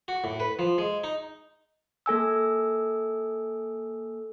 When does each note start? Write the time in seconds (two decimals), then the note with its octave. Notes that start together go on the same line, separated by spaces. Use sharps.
0.08 F#4
0.24 A2
0.40 B4
0.59 F3
0.78 G#3
1.04 D#4
2.06 A#3 A4 G#5 E6